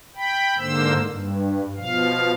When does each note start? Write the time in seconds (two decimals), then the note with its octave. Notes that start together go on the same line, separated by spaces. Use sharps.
0.15 G5 B5
0.58 G#2 D3 A#3 C5 E6
1.05 G2
1.76 B2 F3 F5